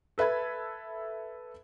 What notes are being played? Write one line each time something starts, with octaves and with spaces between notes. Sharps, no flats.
A4 B4 E5 B5 G#6